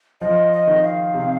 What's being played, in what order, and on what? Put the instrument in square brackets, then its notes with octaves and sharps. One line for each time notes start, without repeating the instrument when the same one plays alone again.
[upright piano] F3 [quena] D#5
[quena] D#5
[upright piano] D#3
[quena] F5
[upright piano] C3